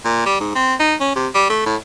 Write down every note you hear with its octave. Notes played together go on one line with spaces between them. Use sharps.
A#2
G3
G#2
C4
D#4
C#4
C3
G3
A3
A2